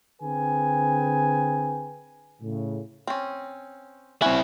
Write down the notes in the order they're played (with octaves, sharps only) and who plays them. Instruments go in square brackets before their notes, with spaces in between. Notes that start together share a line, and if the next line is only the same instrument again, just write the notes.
[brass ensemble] D3 C4 G#4 B4 G5 G#5
A2 C#3
[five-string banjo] C4 C#4
[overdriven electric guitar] C4 E4 [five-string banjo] C#4 F#5 G#5